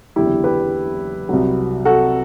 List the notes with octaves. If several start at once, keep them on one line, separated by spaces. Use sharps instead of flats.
F#1 E2 D3 E4 G4
G4 B4
C2 C3 F#3
F#4 A4